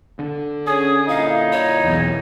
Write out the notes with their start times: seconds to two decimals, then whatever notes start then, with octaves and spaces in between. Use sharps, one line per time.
0.19 D3
0.67 C#4 G#4 D#6
1.09 A#2 G3 D#4 E4 F5
1.52 C#5
1.84 B1 E2